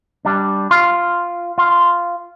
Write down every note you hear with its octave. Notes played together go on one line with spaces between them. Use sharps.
G3 D4
F4
F4